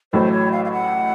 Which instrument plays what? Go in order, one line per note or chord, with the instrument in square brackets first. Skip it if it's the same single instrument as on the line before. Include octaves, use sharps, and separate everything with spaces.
[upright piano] A1 A2 F#3 A3 [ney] C5
[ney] C#5
F5
F5
F#5